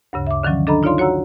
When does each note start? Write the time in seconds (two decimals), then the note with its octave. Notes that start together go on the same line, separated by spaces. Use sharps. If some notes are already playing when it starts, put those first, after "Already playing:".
0.13 D2 G2 C#3
0.27 E5 D6
0.43 D3 D#3 F3 F#3 C#4
0.67 D4 A4 D#5 A#5 B5
0.83 D#4 F4 C#5 D5 F5 C6
0.98 F#4 C#5 F#5 A#5 E6